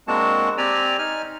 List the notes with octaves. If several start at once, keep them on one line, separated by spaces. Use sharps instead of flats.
G#3 A#3 C4 D4 F#4 A5
C4 G4 D5 G#5 A#5
D#4 G#5 F6